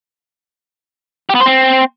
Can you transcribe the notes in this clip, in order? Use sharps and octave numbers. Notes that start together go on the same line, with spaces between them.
G4
B3
C5
C4